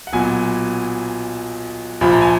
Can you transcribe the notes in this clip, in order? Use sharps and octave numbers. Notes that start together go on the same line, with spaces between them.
F#5
B1 A#2 F#3 B3 G#5
A#1 A#2 F3 B5
A#5
G#5